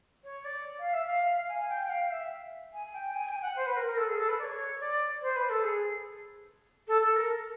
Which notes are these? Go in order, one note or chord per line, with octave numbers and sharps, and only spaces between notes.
C#5
D5
F5
E5
F5
G#5
G5
F5
E5
G#5
G5
G#5
G5
F#5
C5
B4
A#4
A#4
A4
G#4
A4
B4
D5
C#5
D5
C5
B4
A4
G#4
A4
A4
A#4